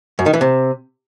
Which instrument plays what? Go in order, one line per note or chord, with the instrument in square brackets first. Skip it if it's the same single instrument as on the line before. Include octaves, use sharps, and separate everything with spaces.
[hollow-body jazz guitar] F#2
D#3
E3
C3